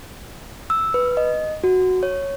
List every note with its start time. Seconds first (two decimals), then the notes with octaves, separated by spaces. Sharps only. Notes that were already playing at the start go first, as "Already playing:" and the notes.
0.70 E6
0.94 B4
1.17 D#5
1.64 F#4
2.03 C#5